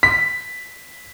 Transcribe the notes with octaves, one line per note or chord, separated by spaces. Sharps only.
B6